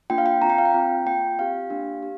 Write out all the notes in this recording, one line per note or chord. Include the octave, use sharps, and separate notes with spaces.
A#3 D4 F4 G5
F5
G5
C4 F4 A#5
G5
F5
G5
C4 F4
A#3 F4 G5
C4 G4 F5
A#3 D4 G4
G4